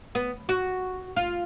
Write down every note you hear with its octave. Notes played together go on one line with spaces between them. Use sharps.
B3
F#4
F4